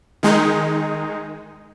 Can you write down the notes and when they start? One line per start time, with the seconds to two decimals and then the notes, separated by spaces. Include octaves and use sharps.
0.23 D#3 G#3 D#4